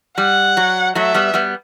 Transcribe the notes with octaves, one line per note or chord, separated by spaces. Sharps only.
G3 F#5
F#3
F#3 A3 E5
G3 B3
G3 B3